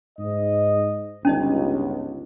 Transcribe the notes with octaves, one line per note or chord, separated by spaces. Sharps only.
G#2 D#5
G1 C#2 C#4 D#4 D#5